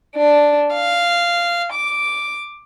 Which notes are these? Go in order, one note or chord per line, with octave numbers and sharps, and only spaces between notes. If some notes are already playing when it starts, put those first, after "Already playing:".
D4
F5
D6